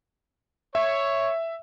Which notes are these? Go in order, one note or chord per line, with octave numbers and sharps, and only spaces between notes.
C#5 E5